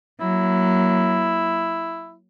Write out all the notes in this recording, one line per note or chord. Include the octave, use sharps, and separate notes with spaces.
F#3 A#3 E4